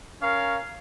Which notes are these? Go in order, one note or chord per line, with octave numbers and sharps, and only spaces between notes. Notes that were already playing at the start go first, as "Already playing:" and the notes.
C#4 A#4 C#5 F5